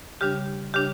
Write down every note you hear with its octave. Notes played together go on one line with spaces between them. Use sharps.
C#3 G3 D4 G4
C#3 G3 D4 G4